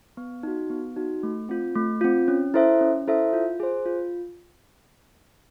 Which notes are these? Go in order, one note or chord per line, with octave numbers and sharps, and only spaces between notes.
B3
D#4 F#4
B3
D#4 F#4
A3
C4 F4
A3
C4 F4
C#4
E4 A4 C5 E5
C#4
E4 A4 C5 E5
F4
G#4 C5
F4